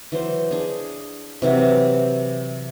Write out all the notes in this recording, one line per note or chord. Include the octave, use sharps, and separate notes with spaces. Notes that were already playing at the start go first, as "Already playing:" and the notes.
E3 F#3 C5
D4 G#4
C3 E3 F#3 E4